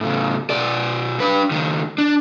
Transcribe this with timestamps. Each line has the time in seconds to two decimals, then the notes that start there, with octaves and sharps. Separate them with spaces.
0.01 A2 C#3
0.50 B2 D5
1.20 D4 B4
1.51 C#2 D#3
1.98 D4